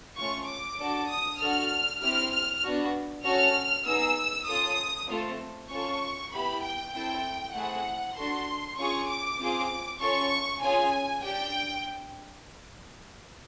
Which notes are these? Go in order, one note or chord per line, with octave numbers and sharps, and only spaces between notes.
A3 C#4 F4 C#6
D6
D4 F#4 A4
D#6
D4 F#4 A4 F6
C4 E4 G4 F6
F6
B3 D4 F#4
C#4 F#4 A4 F6
B3 D#4 G#4 E6
C#4 F4 A4 D#6
A3 C4 F4 A4
C#4 F4 A4 C#6
B3 E4 G4 B5
G5
C4 E4 A4 G5
A3 C4 E4 G#4 F#5
D4 F#4 A4 C6
C#4 F4 G#4 C#6
D6
C4 F4 G#4
C#4 F4 A4 C#6
C#4 F4 G#4 G#5
D4 G4 G5